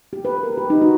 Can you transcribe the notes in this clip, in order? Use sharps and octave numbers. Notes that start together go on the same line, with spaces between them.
G4
B4
A#4
G4
D#4
F#4